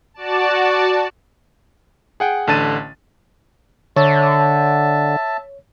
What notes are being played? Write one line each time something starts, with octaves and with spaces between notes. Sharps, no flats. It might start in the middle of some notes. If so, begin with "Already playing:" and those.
F#4 D5 A5
G#4 F#5 G5
A1 D3 A5 A6 D#7
D3 C#5 E5 A5